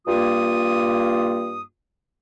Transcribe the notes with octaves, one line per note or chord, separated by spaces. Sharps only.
G2 A#3 F4 D#6